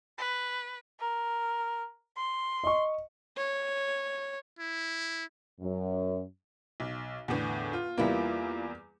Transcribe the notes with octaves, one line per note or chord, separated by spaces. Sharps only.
B4
A#4
C6
D#5 C#6
C#5
E4
F#2
B1
E2 A2 D3 B3 F#5
F4
E2 G3 A#3 E4 F4 B4